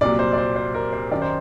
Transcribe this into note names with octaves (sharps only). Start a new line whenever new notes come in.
C2 A#2 F#3 D5
C5
D5
C5
C5
A#4
C5
F#2 D#3 D5
C5